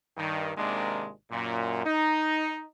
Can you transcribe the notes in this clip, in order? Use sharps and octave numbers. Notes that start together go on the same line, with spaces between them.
G2 D#3
G#1 C3 D#3 G#3 A#3 D4
F#2 A#2
D#4